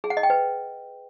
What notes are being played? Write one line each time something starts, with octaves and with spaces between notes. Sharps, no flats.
G#4
F#5
D#5
G5
B4